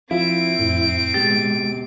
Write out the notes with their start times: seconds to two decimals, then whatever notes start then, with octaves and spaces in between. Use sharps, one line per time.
0.11 F3 C4 E4 F4 D7
0.59 F2 A2
1.14 B2 G#3 G4 A6